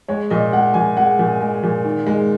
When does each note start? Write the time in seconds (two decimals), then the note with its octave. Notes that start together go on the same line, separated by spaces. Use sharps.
0.08 G#3 C#5
0.30 A#2 D#5
0.53 G#3 F#5
0.74 A#2 G#5
0.97 G#3 F#5
1.19 A#2
1.41 G#3
1.63 A#2
1.85 D#3
2.07 G#3